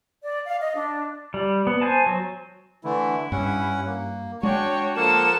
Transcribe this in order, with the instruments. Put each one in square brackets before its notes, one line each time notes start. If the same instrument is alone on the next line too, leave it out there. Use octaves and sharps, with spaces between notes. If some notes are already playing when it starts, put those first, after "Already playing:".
[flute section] D5
F5
D#5
D4
[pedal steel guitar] G3
B3
C5 G#5 A5
F#3
[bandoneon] D3 E3 A3 [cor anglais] E4
[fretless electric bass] G2 [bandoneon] C#4 F#5
[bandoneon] A#3
[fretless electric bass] G#3 [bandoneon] D4 [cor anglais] F#4 [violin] C#5 G5
[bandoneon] F3 A#4 F#5 [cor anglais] A#3 [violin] A4 E7